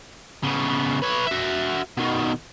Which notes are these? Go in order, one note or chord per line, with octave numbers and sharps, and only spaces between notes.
C#3 B3
B4 C#5
F#4 E5
B2 D#3